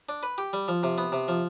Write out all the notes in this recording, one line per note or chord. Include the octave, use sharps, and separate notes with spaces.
D4
B4
G4
G3
F3
C3
B3
C3
F3